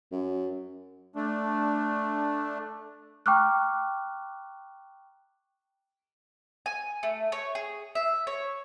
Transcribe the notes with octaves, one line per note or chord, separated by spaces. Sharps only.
F#2
A3 D4
G5 A#5 C#6 D6 F6 F#6
G#5
A3
C#5
G#4
E5
C#5